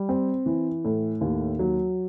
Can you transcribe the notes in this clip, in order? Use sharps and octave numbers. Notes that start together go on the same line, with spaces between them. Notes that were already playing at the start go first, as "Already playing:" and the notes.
Already playing: G3
C4
E3
A2
D#2
F#3